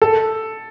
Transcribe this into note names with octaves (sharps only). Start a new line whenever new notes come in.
A4